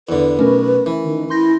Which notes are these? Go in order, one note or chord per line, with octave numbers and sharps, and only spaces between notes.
E2 D3 B4
B1 A3 C#4 A#4
E3
D#3
E4 C6 G6 A#6